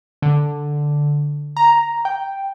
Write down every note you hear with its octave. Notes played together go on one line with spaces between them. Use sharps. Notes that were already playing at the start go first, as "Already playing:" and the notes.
D3
A#5
G5